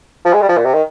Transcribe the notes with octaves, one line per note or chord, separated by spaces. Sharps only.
F3
G#3
G3
F3
A#2
C3
D#3